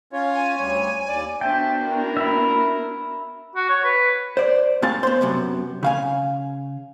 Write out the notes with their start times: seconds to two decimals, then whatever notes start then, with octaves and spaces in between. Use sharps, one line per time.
0.13 C#4 F4 C#5
0.33 G#5
0.59 D2 G3 C#5
1.08 D#2 D5
1.41 B3 D4 F#4 C5 E5 G5 A5
1.81 E4 A#4
2.17 E5 B5
3.55 F#4
3.69 C#5
3.84 B4
4.37 C5 D5
4.82 G#2 G#3 C4 F5 A5
5.03 B3 C5
5.21 F#2 C3 B3
5.83 C#3 F5 G#5